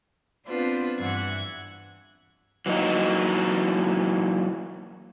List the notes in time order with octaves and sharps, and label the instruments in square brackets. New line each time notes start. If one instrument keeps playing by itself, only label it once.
[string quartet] B3 C4 D4 F4 B4 C5
G2 E3 E5 F#5 G#6
[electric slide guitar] E3 F#3 A#3 D#4